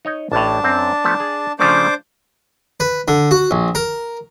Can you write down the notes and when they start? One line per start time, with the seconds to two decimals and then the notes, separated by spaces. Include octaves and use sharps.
0.05 D#4 C#5 D#5
0.32 A1 A2 D4 A5
0.64 F#2 C4
1.04 F3 A3 B3
1.20 G#4
1.59 C#3 F3 A3 D4 C5 D6
2.80 B4
3.08 D3
3.31 F#4
3.51 A#1
3.75 A#4